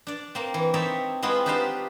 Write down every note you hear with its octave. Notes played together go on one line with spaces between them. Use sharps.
D4 D5
A#3 C4
E3
C4 D#4 C#5 D5 E5 A5
G#3 B3 C4 E4 F4
D4 D#4 G4 B4 C5 F5